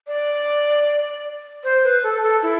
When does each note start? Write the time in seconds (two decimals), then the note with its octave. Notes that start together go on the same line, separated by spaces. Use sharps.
0.07 D5
1.64 C5
1.84 B4
2.03 A4
2.23 A4
2.43 E4